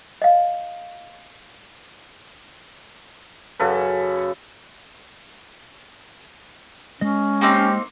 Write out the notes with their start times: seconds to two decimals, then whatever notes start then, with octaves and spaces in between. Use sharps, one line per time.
0.22 D#5 F5
3.59 F#2 C#3 A4 B4
7.01 G#3 C#4 D#5
7.41 A#3 C4 D#4 G4